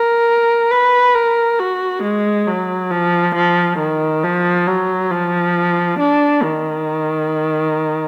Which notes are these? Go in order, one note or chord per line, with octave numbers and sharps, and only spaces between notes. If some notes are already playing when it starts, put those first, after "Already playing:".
Already playing: A#4
B4
A#4
F#4
G#3
F#3
F3
F3
D#3
F3
F#3
F3
D4
D#3